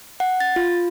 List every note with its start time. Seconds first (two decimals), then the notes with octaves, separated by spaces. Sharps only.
0.20 F#5
0.40 A6
0.56 F4